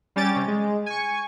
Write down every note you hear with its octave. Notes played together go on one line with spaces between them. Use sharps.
G3 C#4 G4 A6 D7
C3 C#4
G#3
G#5 C#6